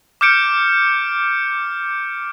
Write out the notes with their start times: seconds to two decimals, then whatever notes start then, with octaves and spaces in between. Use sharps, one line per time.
0.21 D6 F6 G6 C#7 D7